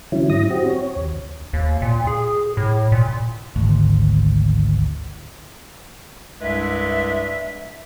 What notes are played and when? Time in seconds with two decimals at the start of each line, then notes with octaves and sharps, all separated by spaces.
0.12 D3 E3 F#3 C#4 E4
0.30 G#2 E4 D#6 A#6
0.51 C4 F#4 G4
0.67 C#5
0.96 D#2
1.53 D#2
1.82 A#2
2.07 G#4
2.57 A2
2.92 A#2
3.56 G#1 D2
6.40 C2 G2 G#3 B4 E5